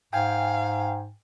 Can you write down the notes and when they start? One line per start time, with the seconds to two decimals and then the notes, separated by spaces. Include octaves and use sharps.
0.13 G#2 F5 G5 G#5